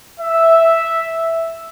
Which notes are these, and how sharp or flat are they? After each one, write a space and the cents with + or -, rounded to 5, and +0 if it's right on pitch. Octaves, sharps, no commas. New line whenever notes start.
E5 +0